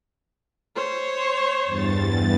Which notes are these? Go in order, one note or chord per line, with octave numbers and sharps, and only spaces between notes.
C5 C#5
E2 G2 A6